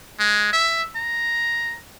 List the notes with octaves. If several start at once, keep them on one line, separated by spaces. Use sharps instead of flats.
G#3
E5
A#5